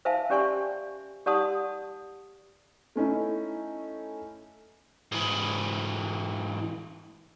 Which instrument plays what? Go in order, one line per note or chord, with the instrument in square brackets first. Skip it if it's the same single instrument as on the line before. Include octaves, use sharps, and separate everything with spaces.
[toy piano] C5 E5 F5 G#5 A5
C#4 G4 D5 G#5 C6 C#6
G4 D5 F#5 A5 C6 D#6
[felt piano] A3 C#4 D#4 E4
[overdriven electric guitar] G#2 E3